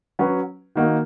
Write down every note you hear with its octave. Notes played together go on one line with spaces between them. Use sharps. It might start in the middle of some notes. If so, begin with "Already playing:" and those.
F#3 C#4 F#4 B4
D#3 A#3 D#4 F#4